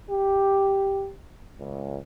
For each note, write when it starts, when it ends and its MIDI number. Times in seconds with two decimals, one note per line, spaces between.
0.10 1.12 67
1.59 1.99 37